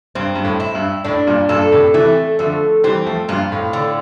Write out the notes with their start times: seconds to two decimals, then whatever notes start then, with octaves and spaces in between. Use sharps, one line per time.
0.15 G2 C4
0.35 G2
0.44 A2
0.60 E4
0.75 G2
1.04 A2 D4
1.27 G2 A#2
1.49 G2 A#2 A4
1.72 A2 C3
1.94 C3 E3 A3
2.39 D3 F3 A3
2.84 E3 G3 C4
3.06 F3 A3
3.29 G2 A#2 F4
3.52 A2
3.73 D3